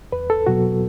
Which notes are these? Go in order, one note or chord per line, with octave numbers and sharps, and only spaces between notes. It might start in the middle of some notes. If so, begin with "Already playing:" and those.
E2 B4
A4
B2 F#3 B3 F#4